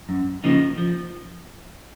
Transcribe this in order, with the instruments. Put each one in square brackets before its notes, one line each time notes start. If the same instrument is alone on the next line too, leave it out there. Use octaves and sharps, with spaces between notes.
[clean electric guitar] F#2
C#3 F3 A#3 D#4
F3